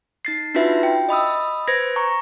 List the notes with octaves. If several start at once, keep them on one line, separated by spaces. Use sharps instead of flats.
D#4 A6 C7
D4 D#4 F4 F#4 B4 E5
G5
D#5 B5 D#6 E6
B4 C5 G#6 A#6
A#5 C#6